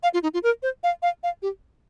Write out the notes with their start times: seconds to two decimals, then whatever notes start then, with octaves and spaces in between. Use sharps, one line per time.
0.03 F5
0.14 F4
0.23 D#4
0.34 F4
0.43 A#4
0.63 C5
0.83 F5
1.02 F5
1.23 F5
1.42 G4